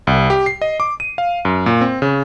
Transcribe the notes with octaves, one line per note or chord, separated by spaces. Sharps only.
C2
G4
C7
D#5
D6
D#7
F5
F#2
A#2
C4
C#3